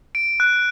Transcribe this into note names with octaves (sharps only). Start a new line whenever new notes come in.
D7
F#6